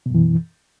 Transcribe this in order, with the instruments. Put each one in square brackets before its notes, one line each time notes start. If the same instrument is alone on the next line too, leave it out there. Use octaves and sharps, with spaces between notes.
[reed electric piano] B2
F#2
E3